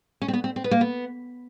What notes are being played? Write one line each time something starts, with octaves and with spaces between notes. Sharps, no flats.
C#4
C4
B3
C4
C4
B3
A#3
B3